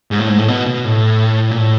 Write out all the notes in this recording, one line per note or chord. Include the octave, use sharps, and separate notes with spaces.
G#2
A2
G#2
A2
B2
B2
A2
A#2
A2